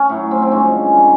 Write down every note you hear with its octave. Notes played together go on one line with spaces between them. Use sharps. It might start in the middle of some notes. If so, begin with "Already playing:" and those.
Already playing: C#4
A2 F#3
C4
C4
G2 D3 F3 G#3 C#4
D#3 F#3